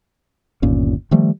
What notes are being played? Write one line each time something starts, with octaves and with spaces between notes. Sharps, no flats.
G1 D#2 A#2 C#4
D#3 F3 G3 A3